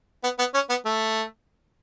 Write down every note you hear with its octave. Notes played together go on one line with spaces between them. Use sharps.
B3
B3
C#4
B3
A3